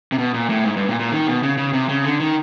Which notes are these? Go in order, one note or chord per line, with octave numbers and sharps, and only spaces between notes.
C3
B2
A#2
A2
G#2
G2
A#2
A#2
D#3
B2
C#3
C#3
C3
C#3
D3
D#3